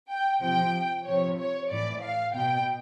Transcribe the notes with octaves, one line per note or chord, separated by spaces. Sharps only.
G5
C3 F3 G5
C3 F3 C#5
C#5
A2 E3 D5
F5
B2 G5